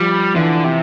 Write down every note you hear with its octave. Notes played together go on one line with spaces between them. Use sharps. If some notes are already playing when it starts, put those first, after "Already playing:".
Already playing: F3 G3
D3 E3
C3